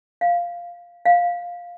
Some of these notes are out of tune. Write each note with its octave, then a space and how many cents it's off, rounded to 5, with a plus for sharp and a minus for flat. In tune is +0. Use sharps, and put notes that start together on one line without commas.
F5 +0
F5 +10